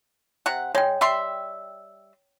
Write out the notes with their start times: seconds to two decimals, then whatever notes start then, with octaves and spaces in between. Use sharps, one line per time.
0.46 C3 F#5
0.75 G#3 C#5 G5
1.01 G3 E5 C6